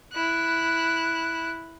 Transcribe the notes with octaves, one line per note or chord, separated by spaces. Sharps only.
E4 F#6